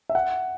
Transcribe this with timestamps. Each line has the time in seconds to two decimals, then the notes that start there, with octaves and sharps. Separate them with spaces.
0.09 E5
0.15 F#5